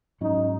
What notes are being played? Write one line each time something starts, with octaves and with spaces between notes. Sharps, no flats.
G#2 F#3 C#4 D#4